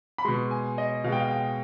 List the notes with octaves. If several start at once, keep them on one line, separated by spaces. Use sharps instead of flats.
B5
B2 G#3 C6
G#5
D#5
B2 G#3 F5 G5
F5
G5